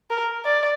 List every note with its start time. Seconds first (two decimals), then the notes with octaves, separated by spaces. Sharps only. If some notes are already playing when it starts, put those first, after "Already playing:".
0.10 A#4
0.45 D5